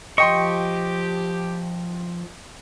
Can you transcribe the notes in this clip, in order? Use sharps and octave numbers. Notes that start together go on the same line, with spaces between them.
F3 G4 D#5 G5 C6 C#6